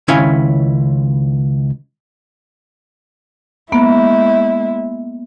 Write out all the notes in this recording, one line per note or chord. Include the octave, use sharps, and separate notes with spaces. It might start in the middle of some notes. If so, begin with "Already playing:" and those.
C#2 D#3 C#4 E4 F5 G#5
G#3 A#3 B3 E4